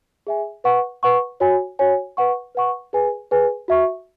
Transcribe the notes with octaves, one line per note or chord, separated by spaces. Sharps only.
G#4 E5 G#5
B4 F#5 C#6
B4 F#5 C#6
F#4 C#5 G#5
F#4 C#5 G#5
B4 F#5 C#6
B4 F#5 C#6
G#4 B4 G#5
G#4 B4 G#5
F#4 E5 C#6